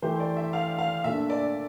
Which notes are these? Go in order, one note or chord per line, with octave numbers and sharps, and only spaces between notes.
E3 A3 E4 G4 C5
D5
E5
F5
F5
A#2 A3 D4 E5
D5